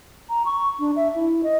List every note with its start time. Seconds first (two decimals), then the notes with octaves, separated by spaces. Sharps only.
0.29 A#5
0.46 C#6
0.79 D4
0.96 E5
1.15 E4
1.43 D#5